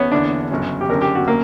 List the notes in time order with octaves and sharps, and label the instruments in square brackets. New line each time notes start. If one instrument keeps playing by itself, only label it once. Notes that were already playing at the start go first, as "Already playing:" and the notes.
Already playing: [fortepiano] B3 C#4
[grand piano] E2 D3 A#3 E4 [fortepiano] D4
[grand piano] G1 F#2 C#3 F#3 C#4
[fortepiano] G4
[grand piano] F#1 F#2 D3 [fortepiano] A#4
[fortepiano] G4
F#4
A#3